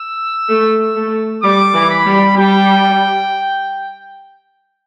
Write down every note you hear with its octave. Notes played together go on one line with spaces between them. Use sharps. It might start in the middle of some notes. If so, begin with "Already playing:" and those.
Already playing: E6
A3
A3
G3 D6
E3
B5
G3
G3 G5